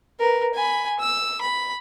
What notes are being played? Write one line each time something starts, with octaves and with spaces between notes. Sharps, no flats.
A#4 B4
G#5 B5
E6
B5